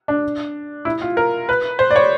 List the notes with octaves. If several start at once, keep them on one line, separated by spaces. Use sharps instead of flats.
D4
E4
F4
A#4
B4
C5
D5
C#5